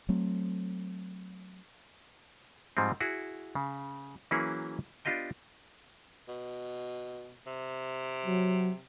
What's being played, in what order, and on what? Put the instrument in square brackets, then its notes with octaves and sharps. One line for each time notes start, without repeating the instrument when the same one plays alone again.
[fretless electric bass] F#3 A3 C4
[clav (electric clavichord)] G#2 F3 G3 G#3 C4
E4 F#4 G#4 F#5
C#3
E3 F#3 A#3 C#4 E4 G#4
B3 D4 F4 G4 D#5 G5
[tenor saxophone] B2
C3
[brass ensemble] F#3